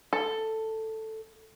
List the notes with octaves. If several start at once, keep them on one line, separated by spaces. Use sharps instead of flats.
A4